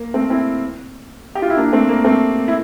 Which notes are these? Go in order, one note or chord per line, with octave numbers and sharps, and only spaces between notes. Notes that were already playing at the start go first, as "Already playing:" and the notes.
Already playing: A#3
A3 C4
C4 E4
G4
F4
E4
A#3 D4
A3 C4
A#3
A3 C4
E4